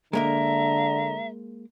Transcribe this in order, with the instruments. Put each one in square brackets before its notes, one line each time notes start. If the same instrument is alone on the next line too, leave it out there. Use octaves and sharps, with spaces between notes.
[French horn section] D3 [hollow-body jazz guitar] G#3 A#3 A#4 [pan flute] E5 [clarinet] A#5